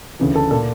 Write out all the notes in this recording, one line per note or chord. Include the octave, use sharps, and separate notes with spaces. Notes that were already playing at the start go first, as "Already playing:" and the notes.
D2 C#3 E3
A4 A5
A#2 A4 A5